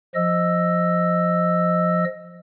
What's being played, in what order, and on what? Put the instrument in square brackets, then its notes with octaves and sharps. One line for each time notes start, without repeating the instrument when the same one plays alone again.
[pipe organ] F3 D#5 E6